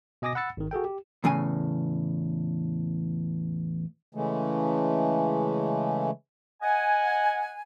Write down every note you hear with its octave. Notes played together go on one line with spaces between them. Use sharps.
B2 D#5 G#5 D6 D#6 A#6
F#5 B5 E6 A6 C#7
G#1 D#3
F#4 G#4 A4 G5
G4
E2 A2 C#3 G#5
C#3 E3 G#3 A3
D#5 F#5 G#5